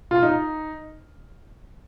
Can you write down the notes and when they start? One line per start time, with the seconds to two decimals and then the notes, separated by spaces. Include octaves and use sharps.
0.11 F4
0.23 D#4